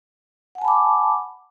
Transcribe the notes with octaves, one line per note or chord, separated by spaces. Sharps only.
F#5 G#5 A5 B5 D6